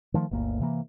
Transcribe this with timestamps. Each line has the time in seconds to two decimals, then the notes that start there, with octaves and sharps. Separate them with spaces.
0.14 D#3 F3 A3
0.31 G1 D2 A#3
0.60 C3 E3 A#3